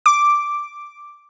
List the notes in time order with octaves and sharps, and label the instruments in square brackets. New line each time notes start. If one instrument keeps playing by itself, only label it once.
[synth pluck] D6